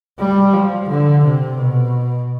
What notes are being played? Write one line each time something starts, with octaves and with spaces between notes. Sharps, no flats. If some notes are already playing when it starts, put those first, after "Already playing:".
G3
F3
D3
C3
B2